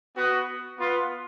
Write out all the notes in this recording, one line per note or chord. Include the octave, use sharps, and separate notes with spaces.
B3 F#4
B3 F4